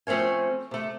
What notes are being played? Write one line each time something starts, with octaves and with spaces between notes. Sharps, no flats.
F3 A3 C4 C#4 G#5
C3 A3